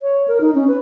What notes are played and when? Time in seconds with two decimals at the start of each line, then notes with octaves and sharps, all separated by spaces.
0.02 C#5
0.28 A#4
0.41 D#4
0.55 C#4
0.68 B4